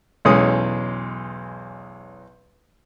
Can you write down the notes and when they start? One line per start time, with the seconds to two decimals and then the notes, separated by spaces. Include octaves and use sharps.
0.25 B1 E2 G#3 C#4 D#6